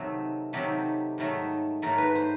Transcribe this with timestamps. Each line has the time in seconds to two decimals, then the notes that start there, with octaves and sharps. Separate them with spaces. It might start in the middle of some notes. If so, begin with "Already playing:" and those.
Already playing: C3 D#3 F#3 A3
0.53 C3 D#3 F#3 A3 G4
1.18 G#2 D#3 F#3 A3
1.82 G#2 D#3 F#3 A3 A#4
1.98 B4
2.15 C5